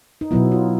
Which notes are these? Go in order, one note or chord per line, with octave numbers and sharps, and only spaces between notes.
D#4
B2 F#3 B3 E4
F4